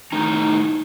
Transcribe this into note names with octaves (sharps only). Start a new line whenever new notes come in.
A2 D#3 D#4 A#5